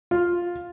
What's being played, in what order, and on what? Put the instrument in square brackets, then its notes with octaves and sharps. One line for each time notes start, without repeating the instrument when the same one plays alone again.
[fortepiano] F4